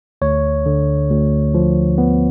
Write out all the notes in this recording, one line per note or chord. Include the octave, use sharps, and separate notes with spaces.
D2 C#5
D3
D2
F3
B3